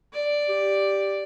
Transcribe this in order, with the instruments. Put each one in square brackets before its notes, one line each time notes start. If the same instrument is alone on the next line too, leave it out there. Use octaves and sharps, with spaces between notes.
[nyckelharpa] D5
[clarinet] G4